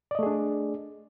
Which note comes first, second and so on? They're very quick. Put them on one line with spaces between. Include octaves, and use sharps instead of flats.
D5 D#5 A3 G#4 D4